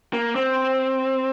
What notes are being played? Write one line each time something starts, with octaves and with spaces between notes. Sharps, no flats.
A#3
C4